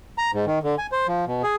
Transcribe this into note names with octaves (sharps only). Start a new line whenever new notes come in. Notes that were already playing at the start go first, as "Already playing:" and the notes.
A#5
G#2
D#3
D3
G#5
C5
F3
B2
G#4